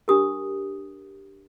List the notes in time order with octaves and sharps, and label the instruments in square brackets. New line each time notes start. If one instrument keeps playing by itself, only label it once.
[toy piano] D4 G4 A#4 D#6